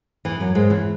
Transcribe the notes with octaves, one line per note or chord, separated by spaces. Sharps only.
E2 E3
F#2 F#3
G#2 G#3
E2 E3